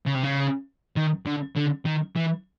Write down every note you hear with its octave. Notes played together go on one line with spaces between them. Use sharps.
C#3
C3
C#3
D#3
D3
D3
D#3
E3